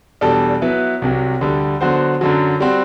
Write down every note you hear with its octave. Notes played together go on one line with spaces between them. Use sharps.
E2 B2 G3 D4 A4
F#3 B3 E4 B4
C2 C3 F#3
D2 D3 G3
D3 F#3 B3 F#4 C5
F#2 D3 F#3
G3 C4 F#4